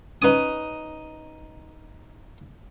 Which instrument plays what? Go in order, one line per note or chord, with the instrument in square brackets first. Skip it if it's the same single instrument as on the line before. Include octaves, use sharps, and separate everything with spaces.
[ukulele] C#4 B4 [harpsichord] D#4 D#6